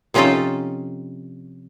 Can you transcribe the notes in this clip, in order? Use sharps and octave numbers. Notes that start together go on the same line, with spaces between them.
C3 F3 C#4 D#4 F4 A4